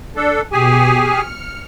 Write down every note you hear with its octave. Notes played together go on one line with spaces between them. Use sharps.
D4 A4
B2 G4 G#4 G#5 C#6
F6 C#7